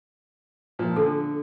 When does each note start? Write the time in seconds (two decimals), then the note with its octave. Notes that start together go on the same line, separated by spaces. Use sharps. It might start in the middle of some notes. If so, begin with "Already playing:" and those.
0.79 A#2 F3
0.96 D3 A4